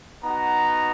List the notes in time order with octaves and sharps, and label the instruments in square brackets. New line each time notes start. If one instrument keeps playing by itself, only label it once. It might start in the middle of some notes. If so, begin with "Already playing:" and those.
[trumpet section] B3 D#4 F#4 A#5